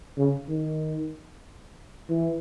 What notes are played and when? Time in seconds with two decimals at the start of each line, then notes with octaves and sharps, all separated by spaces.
0.17 C#3
0.48 D#3
2.09 E3